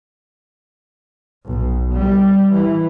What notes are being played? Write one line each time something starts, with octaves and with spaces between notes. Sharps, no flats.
B1
G3
E3